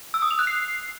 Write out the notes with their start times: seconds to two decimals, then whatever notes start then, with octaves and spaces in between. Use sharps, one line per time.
0.14 E6
0.22 D#6
0.31 F7
0.39 F#6
0.47 C7